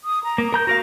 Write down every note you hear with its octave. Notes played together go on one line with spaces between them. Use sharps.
D#6
A#5
A#3
A#4 A#5 G6
F#4 A#4 F5 A#6